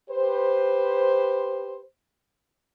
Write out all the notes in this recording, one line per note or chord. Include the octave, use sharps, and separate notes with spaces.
G4 B4 C5